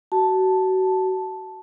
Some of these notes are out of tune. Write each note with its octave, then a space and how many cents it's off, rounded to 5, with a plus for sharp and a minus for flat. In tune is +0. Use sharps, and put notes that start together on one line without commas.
F#4 +25 A5 +0